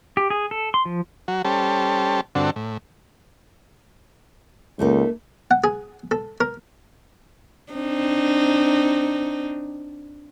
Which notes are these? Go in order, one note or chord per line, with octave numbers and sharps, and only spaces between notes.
G4
G#4
A4
C6
F3
F#3 F#4
G3 C#4 G4 A4 C5 A5
G2 D3 C4 D4 F#4 A4
A2
C#2 A3 A#3 D#4
F#5
G#4
A4
A#4
C4 D4 D#4